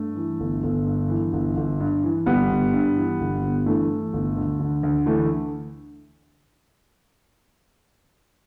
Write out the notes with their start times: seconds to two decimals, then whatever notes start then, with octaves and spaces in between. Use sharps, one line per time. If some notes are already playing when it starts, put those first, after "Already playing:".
Already playing: G2 A3
0.16 E3
0.40 G1
0.63 G1
0.86 G2
1.09 E3
1.33 G1
1.57 G1
1.80 G2
2.04 E3
2.26 G1 G3 B3
2.50 G1
2.73 G2
2.96 E3
3.20 G1
3.43 G1
3.66 G2 E3 A3
3.89 E3
4.13 G1
4.36 D2
4.59 D3
4.83 D2
5.06 D3 E3 A3